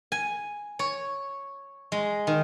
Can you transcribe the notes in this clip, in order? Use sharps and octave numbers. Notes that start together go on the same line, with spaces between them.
G#5
C#5
G#3
D#3